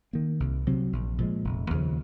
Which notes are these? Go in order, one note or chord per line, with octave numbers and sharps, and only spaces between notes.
D#3 A#3
C2
C3 F#3 C4
A#1
A#2 F3 G#3
F1
D#2 C#3 F3